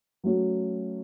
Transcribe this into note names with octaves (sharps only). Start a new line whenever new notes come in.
F#3 A3 C#4 F#4